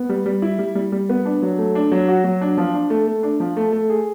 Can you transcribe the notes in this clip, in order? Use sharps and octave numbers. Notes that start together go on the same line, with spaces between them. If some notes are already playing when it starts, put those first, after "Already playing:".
Already playing: B3
G3
G3
E4
G3
G3
G3
B3
D4
F#3
A3
D4
F#3
F#4
F#3
D4
F3
D4
A3
A3
D4
F3
A3
A3
G#4